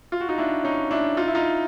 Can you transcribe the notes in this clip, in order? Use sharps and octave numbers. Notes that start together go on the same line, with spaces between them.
F4
F#4
D#4 F4
D4 E4
C#4 D#4
D4 E4
D#4 F4
E4
D#4 F4